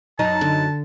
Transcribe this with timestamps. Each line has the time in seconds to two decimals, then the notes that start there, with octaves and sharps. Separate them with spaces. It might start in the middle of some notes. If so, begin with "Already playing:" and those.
0.19 F#2 F#3 D#4 A5
0.41 D3